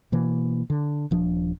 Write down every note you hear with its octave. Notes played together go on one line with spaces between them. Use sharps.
B2 E3 A#3
D3
D#1 F3 D4